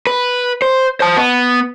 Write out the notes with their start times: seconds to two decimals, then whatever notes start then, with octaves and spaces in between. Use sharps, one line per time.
0.07 B4
0.62 C5
1.00 C5 A5
1.16 B3